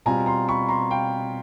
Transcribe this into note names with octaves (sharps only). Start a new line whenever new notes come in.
B2 G3 C4 F4 G#5 A#5
A#5 C6
B5 C#6
A#5 C6
F5 G5